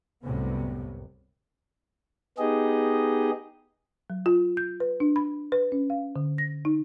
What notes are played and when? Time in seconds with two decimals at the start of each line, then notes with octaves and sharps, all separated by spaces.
0.23 C2 F#2 A2 C3 B3
2.38 B3 D#4 G4 G#4 D#5
4.10 F#3
4.26 F4
4.57 G6
4.80 B4
5.00 D4
5.16 B5
5.52 B4
5.72 C#4
5.90 F5
6.16 D3
6.38 A#6
6.65 D#4